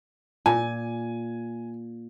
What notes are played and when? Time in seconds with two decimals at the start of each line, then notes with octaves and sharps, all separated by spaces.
0.46 A#2 G#5